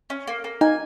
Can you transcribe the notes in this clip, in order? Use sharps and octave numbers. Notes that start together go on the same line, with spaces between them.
C#4
A#3
A#3
D#4 G#5